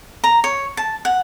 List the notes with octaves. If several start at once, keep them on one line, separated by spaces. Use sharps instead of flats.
A#5
C#5
A5
F#5